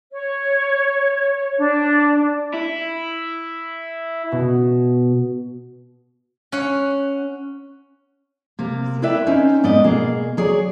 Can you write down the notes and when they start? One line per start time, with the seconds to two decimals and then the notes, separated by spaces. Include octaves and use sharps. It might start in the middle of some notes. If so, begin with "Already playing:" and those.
0.13 C#5
1.58 D4
2.54 E4
4.32 B2
6.52 C#4 F#5
8.59 C3 A#3
9.02 E4 A#4 B4 D5 E5 G5
9.27 C4 C#4 D#4 C5
9.64 G#2 B3 D5 D#5
9.84 B2 A#3 G#4
10.37 F#3 G#4 C#5 D5